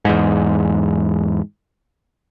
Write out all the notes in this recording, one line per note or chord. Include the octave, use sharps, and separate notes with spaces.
E2 G#2